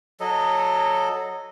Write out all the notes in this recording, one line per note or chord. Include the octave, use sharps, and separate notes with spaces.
F#3 A4 D#5